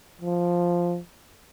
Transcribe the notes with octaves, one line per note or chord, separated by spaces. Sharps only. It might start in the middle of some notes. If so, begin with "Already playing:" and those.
F3